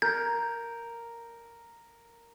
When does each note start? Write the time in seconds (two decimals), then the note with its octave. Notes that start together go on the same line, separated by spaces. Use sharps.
0.02 A#4 G6